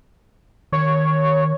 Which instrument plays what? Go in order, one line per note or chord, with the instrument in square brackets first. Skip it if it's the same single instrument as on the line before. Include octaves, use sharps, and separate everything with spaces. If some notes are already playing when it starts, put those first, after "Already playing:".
[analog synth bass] D#3 [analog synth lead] C#5